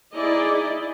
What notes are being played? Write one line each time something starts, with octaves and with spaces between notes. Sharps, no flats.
D#4 E4 G#4 D5 D#5